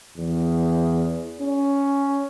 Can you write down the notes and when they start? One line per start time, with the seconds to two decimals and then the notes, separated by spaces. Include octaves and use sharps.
0.17 E2
1.40 C#4